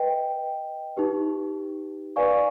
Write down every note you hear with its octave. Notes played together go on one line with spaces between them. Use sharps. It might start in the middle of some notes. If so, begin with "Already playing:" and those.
Already playing: B4 D#5 G5
D#4 G4 B4
B4 D5 F5 G#5 C#6